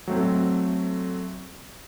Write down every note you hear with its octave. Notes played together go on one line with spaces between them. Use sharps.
F#3 A3 C4